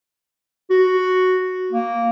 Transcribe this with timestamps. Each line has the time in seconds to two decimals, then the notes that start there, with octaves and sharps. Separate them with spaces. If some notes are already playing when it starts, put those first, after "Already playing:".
0.70 F#4
1.72 A#3